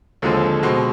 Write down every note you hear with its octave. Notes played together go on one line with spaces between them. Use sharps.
D#2 D3 F3 G#3 C4
B2 G#3 C4